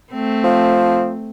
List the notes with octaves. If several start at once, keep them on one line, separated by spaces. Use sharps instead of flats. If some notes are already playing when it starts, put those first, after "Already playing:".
A3 C4
F3